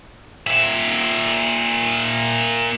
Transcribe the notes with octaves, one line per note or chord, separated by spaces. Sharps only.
A#2 E5